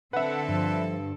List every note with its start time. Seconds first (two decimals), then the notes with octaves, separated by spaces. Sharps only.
0.13 D3 C4 A4 B4 E5 F#5
0.48 G2 F3